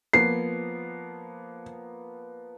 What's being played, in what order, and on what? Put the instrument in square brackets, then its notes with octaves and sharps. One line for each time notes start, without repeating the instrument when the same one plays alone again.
[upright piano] F3 A#3 B3 [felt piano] C7